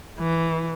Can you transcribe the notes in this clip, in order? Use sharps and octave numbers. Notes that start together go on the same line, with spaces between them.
E3